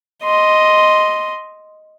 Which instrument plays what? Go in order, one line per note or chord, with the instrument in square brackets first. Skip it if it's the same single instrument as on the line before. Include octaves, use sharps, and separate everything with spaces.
[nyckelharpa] D#5 C6